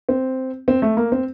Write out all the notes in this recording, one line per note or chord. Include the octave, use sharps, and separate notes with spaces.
C4
C4
A3
A#3
C4